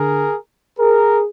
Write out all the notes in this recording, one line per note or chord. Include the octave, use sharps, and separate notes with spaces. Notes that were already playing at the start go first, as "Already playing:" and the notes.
Already playing: D3 G#4 A#4
G#4 A#4